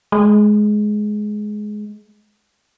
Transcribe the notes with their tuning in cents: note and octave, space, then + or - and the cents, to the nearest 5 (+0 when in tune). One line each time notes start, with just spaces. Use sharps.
G#3 +15